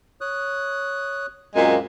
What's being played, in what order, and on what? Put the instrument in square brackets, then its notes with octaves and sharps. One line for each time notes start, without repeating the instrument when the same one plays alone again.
[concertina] C#5 D#6 F#6
[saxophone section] F#2 A#2 G#3 [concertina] A#3 C4